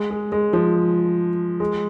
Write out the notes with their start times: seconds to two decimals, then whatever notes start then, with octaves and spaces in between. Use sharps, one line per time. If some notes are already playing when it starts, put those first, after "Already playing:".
Already playing: G#3
0.11 G#3
0.32 G#3
0.53 F3
1.60 G#3